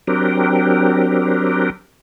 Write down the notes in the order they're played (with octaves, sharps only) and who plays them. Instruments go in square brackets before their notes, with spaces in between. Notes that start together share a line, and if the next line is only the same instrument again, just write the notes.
[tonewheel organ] F#3 C4 D4 G4 A#4